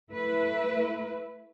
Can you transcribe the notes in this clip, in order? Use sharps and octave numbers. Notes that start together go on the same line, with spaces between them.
A3 E4 B4